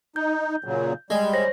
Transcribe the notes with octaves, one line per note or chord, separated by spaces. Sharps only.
D#4 G6
A#2 C#3 F#3
G3 G#3
C5 C#5 A#6